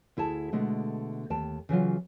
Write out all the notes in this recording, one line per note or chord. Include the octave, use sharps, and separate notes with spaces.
D2 E4 G#4 A5
B2 D3 G#3 A3
D#2 G5 A5
C#3 E3 F#3 F4